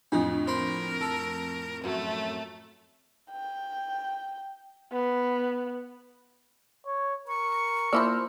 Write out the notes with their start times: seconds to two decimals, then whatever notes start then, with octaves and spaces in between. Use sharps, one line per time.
0.12 F2 A2 D4 D#4 F4
0.48 A#4 C5 B5 C6
1.01 A4
1.84 F#2 A3
3.31 G5
4.92 B3
6.86 C#5
7.28 A#4 C#6
7.93 F3 A#3 E4 C5 D5 E6 F6